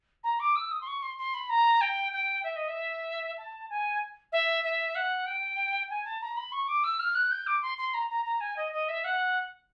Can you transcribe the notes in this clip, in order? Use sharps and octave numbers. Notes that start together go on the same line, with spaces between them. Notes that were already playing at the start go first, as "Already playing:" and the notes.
A#5
D6
E6
D#6
C6
C#6
C6
C6
B5
A#5
G5
G5
E5
D#5
E5
A5
G#5
E5
E5
F#5
G5
G#5
A5
A#5
B5
C#6
D6
E6
F6
F#6
G6
D6
C6
C6
A#5
A#5
A#5
G#5
D#5
D#5
E5
F#5